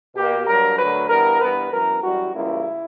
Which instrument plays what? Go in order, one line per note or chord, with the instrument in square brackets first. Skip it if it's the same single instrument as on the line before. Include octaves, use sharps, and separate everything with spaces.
[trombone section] B2 A#3 G4
G2 F#3 A#3 A#4
D2 D3 F#3 B4
G2 E3 B3 A#4
G2 E3 B3 B4
F#2 E3 B3 A#4
F#2 E3 G3 F#4
C#2 C#3 E3 G3 A#3 E4